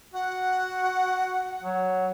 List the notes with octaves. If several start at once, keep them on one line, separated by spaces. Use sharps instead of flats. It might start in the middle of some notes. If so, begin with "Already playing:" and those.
F#4 F#5
F#3